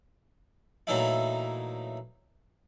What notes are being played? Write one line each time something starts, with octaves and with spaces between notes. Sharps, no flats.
A#2 E3 F#3 A3 D#4 E4